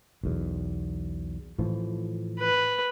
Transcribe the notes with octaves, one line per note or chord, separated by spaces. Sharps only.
B1 E2
A2 E3 F3
B4